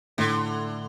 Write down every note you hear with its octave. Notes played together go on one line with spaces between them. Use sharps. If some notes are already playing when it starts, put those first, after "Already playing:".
A2 D3